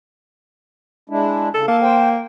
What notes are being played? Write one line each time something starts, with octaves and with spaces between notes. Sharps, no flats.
G#3 D4 E4
C#3 A4
A#3 A4 A5
C5 G5